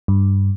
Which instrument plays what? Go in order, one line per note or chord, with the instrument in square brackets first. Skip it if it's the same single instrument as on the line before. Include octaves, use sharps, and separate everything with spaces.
[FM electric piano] G2